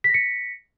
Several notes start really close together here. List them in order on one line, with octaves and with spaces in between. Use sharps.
B6 A#6 C#7